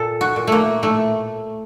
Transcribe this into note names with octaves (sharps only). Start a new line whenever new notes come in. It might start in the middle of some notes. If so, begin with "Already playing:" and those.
Already playing: A#2 A4
F#4
A#2
A3 A#3
A2 A3